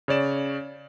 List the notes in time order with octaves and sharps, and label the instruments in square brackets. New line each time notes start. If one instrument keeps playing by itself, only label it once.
[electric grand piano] C#3 C#5 D5 E7